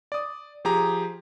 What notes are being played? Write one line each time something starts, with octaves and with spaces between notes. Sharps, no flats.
D5 D#6
F3 G4 G#4 A#5